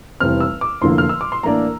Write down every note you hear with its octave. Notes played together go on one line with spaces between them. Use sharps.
F1 E2 E3 G3 C4 F6
E6
D6
F1 E2 D3 F3 A#3 C6
F6
E6
D6
C6
A2 E3 A#3 D4 A#5